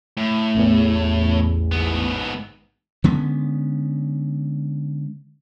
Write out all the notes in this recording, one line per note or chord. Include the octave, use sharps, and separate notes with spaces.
A2
A1 E2
G#2 B3
D3 G#3 B3 C#4